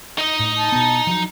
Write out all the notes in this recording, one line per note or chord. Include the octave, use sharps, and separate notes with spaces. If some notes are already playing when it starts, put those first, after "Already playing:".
D#4 D#5
A2
A5
B2 B3
F3 F#3